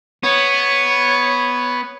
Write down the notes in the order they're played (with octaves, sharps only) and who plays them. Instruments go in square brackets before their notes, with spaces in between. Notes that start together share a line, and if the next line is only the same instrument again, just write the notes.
[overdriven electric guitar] B3 [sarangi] C#5